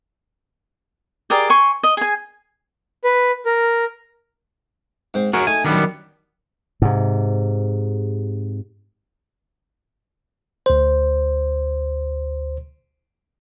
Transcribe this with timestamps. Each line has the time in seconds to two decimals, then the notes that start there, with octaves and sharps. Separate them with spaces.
1.30 G4 G#4 A#4 D5
1.50 G#5 C6 C#6
1.83 D#5
1.97 G#4 G#5
3.04 B4
3.46 A#4
5.14 G#2 C4 C5
5.33 F#4 G#4 A#4 C#5
5.47 A3 D#4 G#5
5.64 F#2 D#3 G3 B3 D4
6.82 G#2 C3
10.66 D2 C5